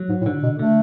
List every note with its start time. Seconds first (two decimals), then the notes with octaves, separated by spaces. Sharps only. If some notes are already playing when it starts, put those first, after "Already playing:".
Already playing: F#3
0.09 G#2
0.21 A2
0.26 G#2 D3
0.43 B2
0.59 D3 A3